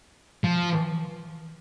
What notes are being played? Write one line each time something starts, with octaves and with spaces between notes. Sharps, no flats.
F3